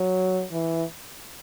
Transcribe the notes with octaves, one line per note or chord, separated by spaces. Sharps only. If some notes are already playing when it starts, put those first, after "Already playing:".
Already playing: F#3
E3